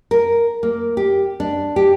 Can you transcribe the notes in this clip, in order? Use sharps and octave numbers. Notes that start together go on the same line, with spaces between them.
A#4
A#3
G4
D4
G4